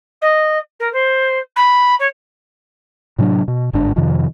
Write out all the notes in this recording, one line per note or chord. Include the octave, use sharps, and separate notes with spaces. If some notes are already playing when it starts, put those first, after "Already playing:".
D#5
A#4
C5
B5
C#5
A2 C3 F#3 D4
B2
G1 G#2 D4
F2 C3 D#3 F3